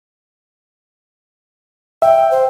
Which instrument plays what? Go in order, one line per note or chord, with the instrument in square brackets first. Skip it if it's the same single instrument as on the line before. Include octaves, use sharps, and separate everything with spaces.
[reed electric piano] E5 [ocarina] G5
[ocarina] C5